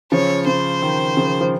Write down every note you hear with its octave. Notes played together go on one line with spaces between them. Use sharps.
C#3 F3 C#5
C#3 C5
D#3
C#3 F3
F3